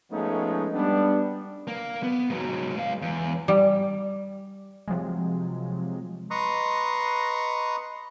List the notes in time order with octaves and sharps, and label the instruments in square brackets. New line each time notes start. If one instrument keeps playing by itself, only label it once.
[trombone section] F3 G#3 A3 B3 C#4 D#4
G3 B3 D4
[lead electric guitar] A#3
B3
G#2 F#3
G#3 F5
E2
[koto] G3
[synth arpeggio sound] C3 F3 F#3 G#3
[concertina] B4 D#5 A#5 C6 C#6 D#6